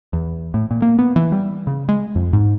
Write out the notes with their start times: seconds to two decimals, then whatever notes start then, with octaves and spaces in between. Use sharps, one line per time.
0.13 E2
0.54 A2
0.71 A#2
0.82 A#3
0.99 B3
1.16 E3
1.32 G3
1.67 C#3
1.89 G#3
2.15 F2
2.33 G#2